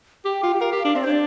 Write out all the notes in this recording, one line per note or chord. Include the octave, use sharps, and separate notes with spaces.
G4 G5
F4
G4
A#4 F5
G4
D4
C4 D5
C5
D4 D5